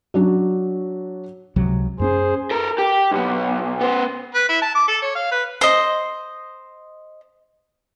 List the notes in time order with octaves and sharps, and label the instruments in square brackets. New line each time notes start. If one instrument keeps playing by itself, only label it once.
[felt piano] F#3 D4 F#4
[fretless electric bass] C#2 C3 F#3
[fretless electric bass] F#2 C4 C#4 [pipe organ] G#4 C5
[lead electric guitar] A4 A#4
G4
B1 B3
B3 C5
[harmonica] B4
E4
A5
D6
A4
C#5
F5
B4
[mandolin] C5 D#5